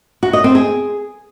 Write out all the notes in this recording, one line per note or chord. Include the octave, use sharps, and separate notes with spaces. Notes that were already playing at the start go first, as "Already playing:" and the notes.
F#4
D#5
C4
G#4